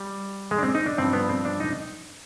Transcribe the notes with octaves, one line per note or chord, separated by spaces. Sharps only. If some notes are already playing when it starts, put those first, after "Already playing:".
Already playing: G3
G#3
D4
C4
D#4
D4
G2 F3 C4
B3
C4
D4
D#4